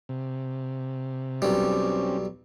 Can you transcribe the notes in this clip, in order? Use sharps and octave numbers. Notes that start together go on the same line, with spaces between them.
C3
B1 G3 C4 C#4